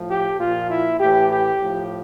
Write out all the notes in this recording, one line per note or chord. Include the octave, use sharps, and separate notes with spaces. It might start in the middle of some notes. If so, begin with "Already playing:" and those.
Already playing: A2 F3
G4
A#2 F3 F4
E4
A2 E3 G4
G4
A2 F3